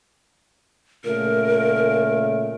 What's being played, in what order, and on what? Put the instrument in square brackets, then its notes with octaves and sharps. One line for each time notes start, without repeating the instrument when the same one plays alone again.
[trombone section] A#2 C#3 A3 [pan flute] A#4